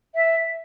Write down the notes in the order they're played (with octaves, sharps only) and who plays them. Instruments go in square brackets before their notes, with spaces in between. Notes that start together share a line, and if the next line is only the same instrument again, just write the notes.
[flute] E5